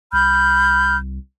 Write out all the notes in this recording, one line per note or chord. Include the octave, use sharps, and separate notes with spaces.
C2 B5 F6 G6